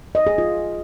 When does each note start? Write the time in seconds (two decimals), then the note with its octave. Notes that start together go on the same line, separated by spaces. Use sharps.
0.15 D#5
0.27 G#4
0.38 F4